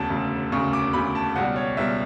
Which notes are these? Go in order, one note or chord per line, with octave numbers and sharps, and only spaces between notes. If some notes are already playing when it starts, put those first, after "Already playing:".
Already playing: E1 D2 C#3 A5
E1 D2 C#3
E1 D2 C#3 C#6
D6
E1 D2 C#3 B5
A5
C#2 B2 G3 F#5
C#5
C#2 B2 G3 E5